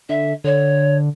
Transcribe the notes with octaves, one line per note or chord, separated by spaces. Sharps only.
D3 E5
D3 C#5